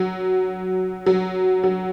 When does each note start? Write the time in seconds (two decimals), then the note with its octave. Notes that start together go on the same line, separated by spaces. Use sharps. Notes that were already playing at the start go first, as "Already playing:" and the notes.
Already playing: F#3
1.06 F#3
1.64 F#3